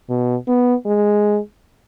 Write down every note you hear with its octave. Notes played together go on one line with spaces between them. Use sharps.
B2
B3
G#3